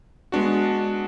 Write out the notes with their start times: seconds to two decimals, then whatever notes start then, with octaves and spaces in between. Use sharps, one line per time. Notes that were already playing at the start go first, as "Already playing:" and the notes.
0.32 G#3 B3 D4 F#4